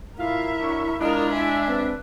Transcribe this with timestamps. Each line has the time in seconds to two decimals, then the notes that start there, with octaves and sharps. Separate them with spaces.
0.18 A2 E4 F4 A#4 E5 F5
0.60 F#3 D4 C#6
1.00 G#3 D4 F4 A#4 D#5
1.32 E5 G#5
1.68 C4 B4